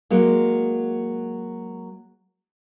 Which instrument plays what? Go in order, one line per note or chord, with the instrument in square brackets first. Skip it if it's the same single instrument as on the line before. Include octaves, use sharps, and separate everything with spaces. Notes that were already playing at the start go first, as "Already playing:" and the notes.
[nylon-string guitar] F#3 G#3 A#3